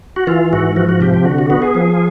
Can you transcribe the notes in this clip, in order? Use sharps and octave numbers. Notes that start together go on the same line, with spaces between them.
F#4
E3 F4
G#2 F#4
F3 F#4
F#4
C3 G4
G4
D3 F#4
F#4
B3 F#4
G#4
F3